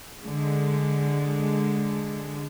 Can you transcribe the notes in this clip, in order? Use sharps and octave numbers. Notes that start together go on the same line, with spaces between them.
D3 G#3